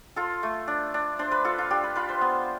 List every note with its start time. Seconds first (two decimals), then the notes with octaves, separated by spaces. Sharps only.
0.16 F4 A4
0.43 A3
0.67 D4
0.94 D4
1.19 D4 C5
1.32 B4
1.45 F4 A4
1.58 F4
1.71 D4 G4
1.84 B4
1.96 F4 B4
2.09 C5
2.21 B3